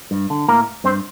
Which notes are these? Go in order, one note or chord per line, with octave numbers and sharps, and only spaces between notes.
G2
D3
A2 A#3 A#4
G2 C4 C5